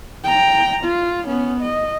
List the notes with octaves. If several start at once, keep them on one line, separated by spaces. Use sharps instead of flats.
G5 A#5
F4
B3 C#4
D#5